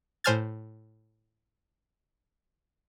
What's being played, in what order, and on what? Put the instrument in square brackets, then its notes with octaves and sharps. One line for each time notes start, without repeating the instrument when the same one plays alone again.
[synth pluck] A2 C5 G#5 F6 G#6 A6